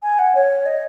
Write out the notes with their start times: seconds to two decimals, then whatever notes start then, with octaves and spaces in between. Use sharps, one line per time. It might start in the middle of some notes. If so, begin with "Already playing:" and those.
0.02 G#5
0.19 F#5
0.35 C#5
0.66 D#5